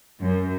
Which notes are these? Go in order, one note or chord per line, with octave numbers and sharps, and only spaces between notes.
F#2